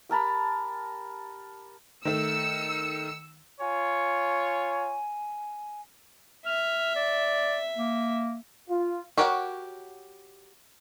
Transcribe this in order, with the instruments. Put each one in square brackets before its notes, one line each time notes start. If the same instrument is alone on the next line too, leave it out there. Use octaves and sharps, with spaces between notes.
[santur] G4 A#4 A5 B5
[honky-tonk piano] D#3 A3 [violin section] E6 C#7
[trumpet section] F4 C#5 [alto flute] G#5
[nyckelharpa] E5 [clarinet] F6
[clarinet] D5
A#3
[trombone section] F4
[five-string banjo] F#4 G4 A#4 C#5 F#5